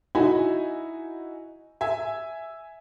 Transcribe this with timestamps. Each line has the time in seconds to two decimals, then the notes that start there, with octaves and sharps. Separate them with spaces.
0.15 D#4 E4 F#4 E5 G#5 B5
1.81 E5 G#5